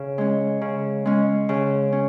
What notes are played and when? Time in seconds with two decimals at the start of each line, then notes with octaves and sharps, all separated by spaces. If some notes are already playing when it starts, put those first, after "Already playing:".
Already playing: C#3
0.18 G#3 C#4
0.61 C#3
1.05 G#3 C#4
1.49 C#3
1.92 C#4